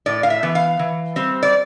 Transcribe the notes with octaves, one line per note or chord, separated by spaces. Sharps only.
A2 D5
F5
E5
E3 B3
F5
E3
G3 C4
D5